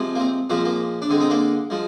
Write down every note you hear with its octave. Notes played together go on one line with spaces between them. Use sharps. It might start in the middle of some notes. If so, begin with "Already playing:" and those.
Already playing: C3 F3 G#3
A#3
C4
A#2 F3 G#3 C4
A#3
D4
D3 G#3 C4
C4 D#4
A#3 D4
F3 G#3